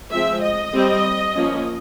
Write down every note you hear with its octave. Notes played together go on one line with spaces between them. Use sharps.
F3 G#3 C4 E5
D#5
G3 C4
F3 A#3 C#4